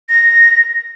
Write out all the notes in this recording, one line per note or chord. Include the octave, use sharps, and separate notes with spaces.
A#6